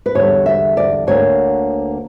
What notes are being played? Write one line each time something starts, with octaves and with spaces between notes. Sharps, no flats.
B4
E2 D3 G3 C#5
E5
D5
D2 D3 A#3 D4 C#5